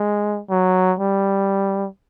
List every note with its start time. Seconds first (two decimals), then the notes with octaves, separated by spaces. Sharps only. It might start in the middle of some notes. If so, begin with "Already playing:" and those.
Already playing: G#3
0.50 F#3
0.99 G3